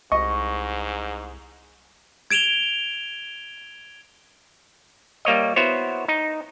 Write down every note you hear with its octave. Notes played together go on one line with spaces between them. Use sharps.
C2 G#2 D#5 C#6
G#6 D7 E7 F7 G7
G3 A#3 C#5 D#5
B3 E4 F#4 C5 C#5
D#4